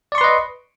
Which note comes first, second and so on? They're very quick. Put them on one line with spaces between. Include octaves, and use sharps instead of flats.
D5 C#6 C6 B4 D#5